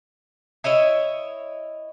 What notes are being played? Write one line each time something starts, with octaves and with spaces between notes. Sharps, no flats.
E4 C#5 D#5 E5